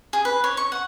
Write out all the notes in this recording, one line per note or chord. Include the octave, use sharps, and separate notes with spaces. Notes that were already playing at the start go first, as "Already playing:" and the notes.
G#4
B4
C#5
C#6
F#5